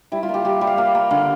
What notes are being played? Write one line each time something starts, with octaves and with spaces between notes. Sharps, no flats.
G3 E4
F4
A#3
G4
G3 G4
G3
F5
A#3 F5
A#3
D3 F5